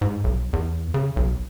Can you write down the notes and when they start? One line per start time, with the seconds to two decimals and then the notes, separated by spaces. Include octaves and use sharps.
0.01 G#2
0.24 B1
0.53 E2
0.94 C#3
1.16 B1